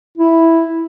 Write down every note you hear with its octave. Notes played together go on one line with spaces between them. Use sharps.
E4